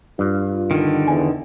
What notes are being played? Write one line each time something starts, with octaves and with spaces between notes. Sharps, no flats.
G2 F4
D3 D#3
E2 G#5